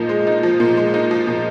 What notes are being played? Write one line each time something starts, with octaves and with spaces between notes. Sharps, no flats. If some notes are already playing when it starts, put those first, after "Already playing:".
Already playing: A#2 F3 D#4
G#3
D#4
F3
A#2
G#3
D#4
F3
A#2